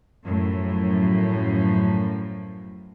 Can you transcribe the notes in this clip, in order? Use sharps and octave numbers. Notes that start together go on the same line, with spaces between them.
F#2 A2 F3